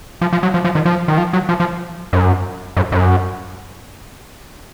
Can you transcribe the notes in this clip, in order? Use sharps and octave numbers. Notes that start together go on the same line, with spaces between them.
F3
F3
F#3
F3
F3
D#3
F3
D#3
F3
F#3
F3
F3
F#2
F#2
F#2